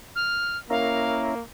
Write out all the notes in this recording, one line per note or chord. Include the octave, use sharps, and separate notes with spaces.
F6
A#3 C#4 E4 A#4 F5